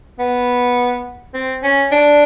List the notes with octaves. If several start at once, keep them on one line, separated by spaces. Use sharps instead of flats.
B3
C4
C#4
D4